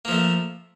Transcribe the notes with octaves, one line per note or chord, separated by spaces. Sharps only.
F3 A3 A#3